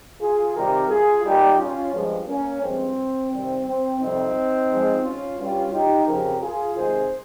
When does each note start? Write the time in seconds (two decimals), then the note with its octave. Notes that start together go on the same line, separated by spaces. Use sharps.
0.21 F4 G#4
0.55 C3 D#3 G3 G4 A#4
0.89 F4 G#4
1.24 A#2 G3 D#4 G4
1.58 C#4 F4
1.93 G2 F3 G#3
2.27 A#3 C#4
2.62 G2 F3 G#3 C4
3.32 C3 D#3 G3 C4
3.66 C4
4.00 F2 C3 G3 C4 D#4
4.70 G#2 F3 G#3
5.04 C#4 F4
5.38 G2 G3 C#4 F4
5.72 D#4 G4
6.07 F2 C#3 F3 G4 A#4
6.42 F4 G#4
6.76 C3 D#3 G#3 G#4 C5